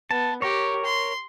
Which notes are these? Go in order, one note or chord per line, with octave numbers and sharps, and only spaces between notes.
B3 A5
G4 A#4 C#5
C6